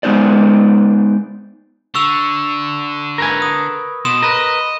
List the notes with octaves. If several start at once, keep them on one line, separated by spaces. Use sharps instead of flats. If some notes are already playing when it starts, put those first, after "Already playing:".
G#3 B3 D#4 C5 D5
D3 C#6 E6 F7
A#4 B4 G#5
D#6
B2 C6 D#6 E7
A#4 B4 D#5